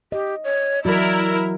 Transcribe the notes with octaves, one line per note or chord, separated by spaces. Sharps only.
G4 D#5
C#5
E3 F#3 E4 F#4 A#4 D5